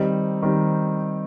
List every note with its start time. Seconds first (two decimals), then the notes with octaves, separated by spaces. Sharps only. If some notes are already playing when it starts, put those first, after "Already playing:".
Already playing: D#3 G3 C4 D#4
0.42 D#3 G3 C4 D#4